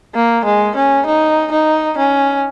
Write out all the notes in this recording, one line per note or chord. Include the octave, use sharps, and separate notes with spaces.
A#3
G#3
C#4
D#4
D#4
C#4